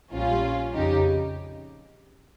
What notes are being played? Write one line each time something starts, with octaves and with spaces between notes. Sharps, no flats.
A#1 A#2 G3 C#4 F4
F2 C#3 F3 D#4 G4